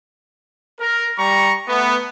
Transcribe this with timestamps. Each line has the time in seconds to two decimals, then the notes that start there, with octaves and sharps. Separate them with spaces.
0.80 A#4
1.18 G3 A#5 C#6
1.68 A3 B3